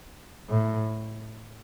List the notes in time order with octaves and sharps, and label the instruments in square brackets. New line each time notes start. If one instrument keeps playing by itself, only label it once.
[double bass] A2